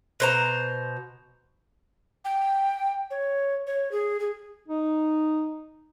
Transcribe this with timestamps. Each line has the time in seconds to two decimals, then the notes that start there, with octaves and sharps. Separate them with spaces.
0.20 B2 C5 A#5
2.25 G5
3.11 C#5
3.67 C#5
3.92 G#4
4.20 G#4
4.68 D#4